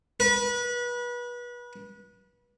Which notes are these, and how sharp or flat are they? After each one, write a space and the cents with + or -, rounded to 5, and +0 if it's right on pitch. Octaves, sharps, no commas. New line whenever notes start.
B4 -30